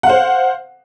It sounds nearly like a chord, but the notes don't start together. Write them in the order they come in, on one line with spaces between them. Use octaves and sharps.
F#5 F5 C5